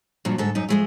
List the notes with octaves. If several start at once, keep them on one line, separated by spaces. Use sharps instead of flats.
G2 A#2 F3 F#3
G#2 D3 A4
F#2 D#4
F3 G#3 A3